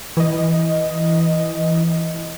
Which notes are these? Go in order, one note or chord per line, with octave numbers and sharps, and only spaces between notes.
E3 D#5